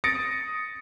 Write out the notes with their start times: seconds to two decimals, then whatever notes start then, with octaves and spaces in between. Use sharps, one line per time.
0.04 D#6 A6 A#6 C#7 D7